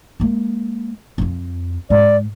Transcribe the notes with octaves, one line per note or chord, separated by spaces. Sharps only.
G#3 A#3
F2 F4
G#2 D5